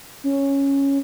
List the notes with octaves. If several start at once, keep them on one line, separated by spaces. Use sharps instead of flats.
C#4